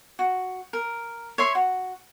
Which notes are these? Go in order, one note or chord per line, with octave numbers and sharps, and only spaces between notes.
F#4
A#4
C#5 E5 C6
F#4